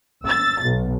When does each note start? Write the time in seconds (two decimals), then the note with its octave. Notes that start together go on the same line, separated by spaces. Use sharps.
0.24 E6 A6
0.62 B1